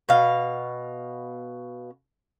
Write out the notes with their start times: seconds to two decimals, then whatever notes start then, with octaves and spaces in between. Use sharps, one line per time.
0.09 B2 F5